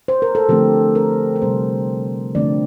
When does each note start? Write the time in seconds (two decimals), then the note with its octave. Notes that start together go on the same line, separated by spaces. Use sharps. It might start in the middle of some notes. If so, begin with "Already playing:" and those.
0.08 C5
0.22 A#4
0.35 A4
0.49 D3 F3 A3 C4 G4
0.95 A#4
1.36 A#4
1.42 C3 G3 C4 C5
2.35 D3 F3 A3 C4 D5